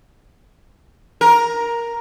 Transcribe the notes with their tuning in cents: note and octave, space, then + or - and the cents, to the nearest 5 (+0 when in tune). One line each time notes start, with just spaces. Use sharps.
A#4 +5